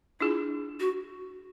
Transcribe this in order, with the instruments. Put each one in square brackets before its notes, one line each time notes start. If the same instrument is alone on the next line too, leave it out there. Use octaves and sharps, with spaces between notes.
[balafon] D4 F4 G#4 [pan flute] E4
[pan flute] F#4